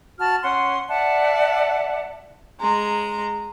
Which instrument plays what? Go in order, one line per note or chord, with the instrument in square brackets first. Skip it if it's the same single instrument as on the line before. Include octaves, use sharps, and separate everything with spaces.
[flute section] F#4 A5 F6
C#4 F#5 C6
D5 E5 F#5 A5
[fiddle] G#3 A#5